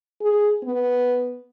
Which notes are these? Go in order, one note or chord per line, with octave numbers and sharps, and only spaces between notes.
G#4
B3